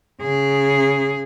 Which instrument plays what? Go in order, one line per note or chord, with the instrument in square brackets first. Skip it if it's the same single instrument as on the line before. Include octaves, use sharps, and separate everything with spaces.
[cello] C#3 G#4